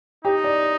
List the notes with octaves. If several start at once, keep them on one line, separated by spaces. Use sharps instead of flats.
D#4 G4
D5